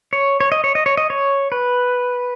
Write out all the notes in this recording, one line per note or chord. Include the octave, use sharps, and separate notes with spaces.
C#5
C#5
D#5
C#5
D#5
C#5
D#5
C#5
B4